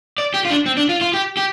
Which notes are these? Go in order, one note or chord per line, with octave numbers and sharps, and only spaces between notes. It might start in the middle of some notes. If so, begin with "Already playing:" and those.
D5
G4
F4
D4
C4
D4
F4
F4
G4
G4